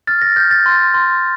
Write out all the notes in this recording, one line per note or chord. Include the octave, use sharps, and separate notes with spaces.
F6 A6
A#6
F6 G6
A6
C6
C6